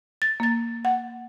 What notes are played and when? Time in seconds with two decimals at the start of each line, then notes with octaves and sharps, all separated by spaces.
0.22 A6
0.40 A#3 A6
0.85 F#5